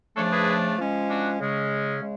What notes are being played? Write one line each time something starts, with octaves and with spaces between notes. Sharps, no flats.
C#3 F3 A3 D4 A4 C#5
G#4 B4
F3 G#3 C#4
D4 F#4
C#3 G#3 C#4
C#3 G#3